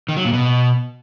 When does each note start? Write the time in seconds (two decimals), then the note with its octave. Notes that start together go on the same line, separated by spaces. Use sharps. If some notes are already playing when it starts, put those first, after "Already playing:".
0.09 D#3
0.17 F#3
0.25 A#2
0.33 B2